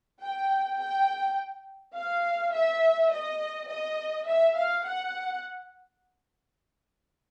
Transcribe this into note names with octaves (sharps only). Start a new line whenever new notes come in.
G5
G5
F5
E5
D#5
D#5
E5
F5
F#5